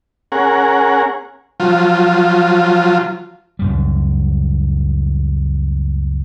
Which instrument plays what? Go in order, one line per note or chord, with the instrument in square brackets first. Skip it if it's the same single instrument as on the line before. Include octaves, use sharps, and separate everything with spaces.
[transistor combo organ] C#4 G#4 A#4 F#5
F3 F#3 F4
[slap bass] C#2 F#2 G3